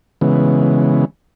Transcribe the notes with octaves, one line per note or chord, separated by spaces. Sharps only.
C#3 E3 G#3 B3